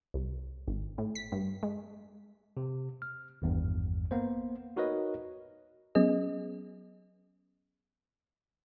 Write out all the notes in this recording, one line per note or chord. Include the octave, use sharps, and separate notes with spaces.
C2
G#1
A2
B6
G2
G#3
C3
F6
G#1 E2 G2
A#3 B3 C5
D#4 F#4 A#4 B4 C#5 D#5
F#3 B3 C#4 G#4 D#5